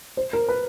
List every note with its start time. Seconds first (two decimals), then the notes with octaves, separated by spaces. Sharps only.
0.17 C5
0.33 A#4
0.49 B4